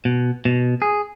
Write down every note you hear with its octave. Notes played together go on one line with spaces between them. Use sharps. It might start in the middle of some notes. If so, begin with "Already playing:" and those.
B2
B2
G#4